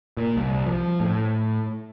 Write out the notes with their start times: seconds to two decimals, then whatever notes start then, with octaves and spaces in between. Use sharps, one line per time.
0.17 A#2
0.37 C2
0.66 F3
1.00 A2